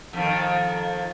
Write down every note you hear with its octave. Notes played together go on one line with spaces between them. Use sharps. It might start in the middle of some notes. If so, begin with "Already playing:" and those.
F2 D#3